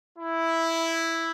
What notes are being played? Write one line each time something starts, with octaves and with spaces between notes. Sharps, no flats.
E4